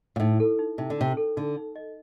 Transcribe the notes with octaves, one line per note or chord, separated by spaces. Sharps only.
A#2
A2 D#4
A4
D#4
C3 D#4
D3
C3 D#4
A4
D3 D#4
D#4
D#5